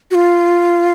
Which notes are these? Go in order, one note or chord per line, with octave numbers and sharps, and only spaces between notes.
F#4
F4